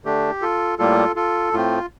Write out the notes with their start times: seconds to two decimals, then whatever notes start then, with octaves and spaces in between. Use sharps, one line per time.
0.05 D3 A3 D4 G4
0.42 F4 A4
0.79 A2 G3 A#3 F4 A4
1.16 F4 A4
1.53 A2 A3 C4 F4